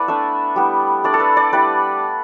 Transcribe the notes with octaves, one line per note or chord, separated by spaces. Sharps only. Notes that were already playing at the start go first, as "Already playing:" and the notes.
Already playing: B3 E4 A4 B4 D5
A3 D4 E5
G3 B3 E4
A3 D4 D5
A4
B4
D5
G3 E4 B4